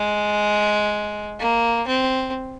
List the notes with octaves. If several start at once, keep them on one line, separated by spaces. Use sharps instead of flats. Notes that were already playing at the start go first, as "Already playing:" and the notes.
Already playing: G#3
A#3
C4